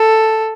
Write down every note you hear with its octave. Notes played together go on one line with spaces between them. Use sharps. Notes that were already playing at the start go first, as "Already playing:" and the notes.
Already playing: A4